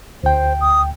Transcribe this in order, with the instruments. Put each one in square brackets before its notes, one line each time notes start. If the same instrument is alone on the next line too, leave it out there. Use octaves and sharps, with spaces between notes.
[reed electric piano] D2 G5 [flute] C5
[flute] D#6